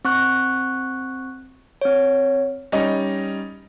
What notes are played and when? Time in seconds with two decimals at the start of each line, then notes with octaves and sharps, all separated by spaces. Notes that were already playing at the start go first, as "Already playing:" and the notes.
0.05 C4 C#6 F#6
1.81 C4 C#5
2.72 G3 C#4 D#4 D#5